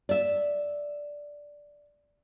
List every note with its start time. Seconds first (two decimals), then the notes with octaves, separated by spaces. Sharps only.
0.09 D5 E5